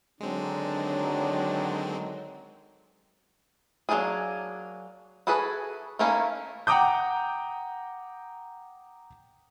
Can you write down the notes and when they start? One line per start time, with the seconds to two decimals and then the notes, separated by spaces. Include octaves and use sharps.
0.21 D3 D#3 F#3 G#3 C4 D4
3.89 F#3 A3 A#3 D4 G#4
5.27 E4 F#4 G#4 A4 B4
5.99 D#3 A3 A#3 C#4 E4
6.67 F#5 G5 A#5 D6 D#6 G6